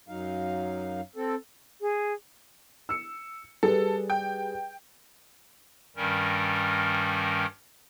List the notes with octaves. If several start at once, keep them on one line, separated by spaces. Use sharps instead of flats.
F#2 F#3 D#4 F5
C4 A4
G#4
E6 C#7
G3 G#4 A4 B4
G5
G2 D#3 G3 C#4 A#4